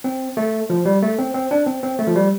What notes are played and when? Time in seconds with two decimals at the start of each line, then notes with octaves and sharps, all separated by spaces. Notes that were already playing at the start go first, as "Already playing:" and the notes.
0.04 C4
0.37 A3
0.70 F3
0.85 G3
1.02 A3
1.19 C4
1.34 C4
1.51 D4
1.66 C4
1.83 C4
1.99 A3
2.07 F3
2.16 G3